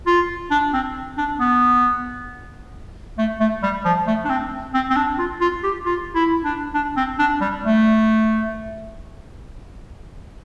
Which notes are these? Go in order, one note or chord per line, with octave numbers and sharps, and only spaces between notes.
F4
D4
C4
D4
B3
A3
A3
G3
F3
A3
D4
C4
C4
C4
D4
F4
F4
G4
F4
E4
D4
D4
C4
D4
G3
A3